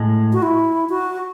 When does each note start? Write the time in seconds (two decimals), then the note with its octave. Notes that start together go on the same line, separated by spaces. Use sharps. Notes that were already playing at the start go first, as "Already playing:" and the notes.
Already playing: A2 G#3
0.33 F#4
0.43 E4
0.90 F#4